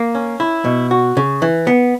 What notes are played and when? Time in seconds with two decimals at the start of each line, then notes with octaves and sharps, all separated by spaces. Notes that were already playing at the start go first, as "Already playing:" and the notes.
Already playing: A#3
0.15 C#4
0.40 E4
0.65 B2
0.91 F#4
1.17 C#3
1.42 E3
1.67 B3